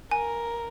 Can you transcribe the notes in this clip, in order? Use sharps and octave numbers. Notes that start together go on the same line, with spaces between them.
A#4 G#5